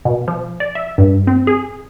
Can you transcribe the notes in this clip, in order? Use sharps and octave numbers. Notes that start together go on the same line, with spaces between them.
B2
F3
D5
E5
G2
C4
G#4